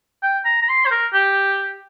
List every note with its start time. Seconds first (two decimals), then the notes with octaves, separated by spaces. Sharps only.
0.23 G5
0.45 A#5
0.62 A#5
0.69 C6
0.86 C5
0.91 A#4
1.13 G4